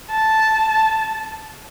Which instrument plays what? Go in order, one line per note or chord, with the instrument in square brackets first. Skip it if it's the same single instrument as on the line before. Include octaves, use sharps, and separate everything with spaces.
[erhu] A5